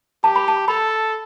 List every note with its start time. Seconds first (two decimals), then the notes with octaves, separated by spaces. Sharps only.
0.24 G4 A5
0.36 B5
0.48 A5
0.68 A4 B5